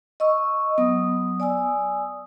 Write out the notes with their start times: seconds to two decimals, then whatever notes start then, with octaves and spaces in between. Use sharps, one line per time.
0.20 D#5 C#6 E6
0.78 F#3 B3 D#6
1.40 D5 G#5 D#6 E6